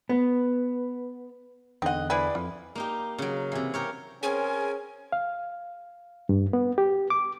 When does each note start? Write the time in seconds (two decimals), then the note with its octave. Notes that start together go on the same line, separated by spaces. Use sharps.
0.09 B3
1.82 E2 D3 C4 D#4 D#5 F#5 F#6
2.10 E4 G#4 B4 C5 D5 G#5
2.35 F2 F4
2.75 A#3 D#4 G4
3.18 C#3 F#3
3.52 C3 E3
3.74 G4 A#4 C#5
4.23 C4 C#4 G#4 A#4 G#5
5.12 F5
6.29 G2
6.53 B3
6.78 G4
7.10 D6